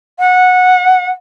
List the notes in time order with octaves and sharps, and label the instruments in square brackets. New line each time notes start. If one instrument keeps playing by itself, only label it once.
[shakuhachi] F#5